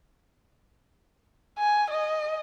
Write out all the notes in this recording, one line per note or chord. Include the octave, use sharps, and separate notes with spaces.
G#5
D#5